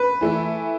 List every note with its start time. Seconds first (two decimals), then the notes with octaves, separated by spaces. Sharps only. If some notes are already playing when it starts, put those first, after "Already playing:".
Already playing: B4
0.21 E3 A3 E4